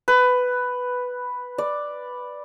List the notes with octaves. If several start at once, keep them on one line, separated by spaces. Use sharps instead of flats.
B4
D5